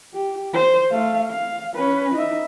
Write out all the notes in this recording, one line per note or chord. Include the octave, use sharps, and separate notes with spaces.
G4
C5
A3 F5
F5
C#4 B4
D#4 E5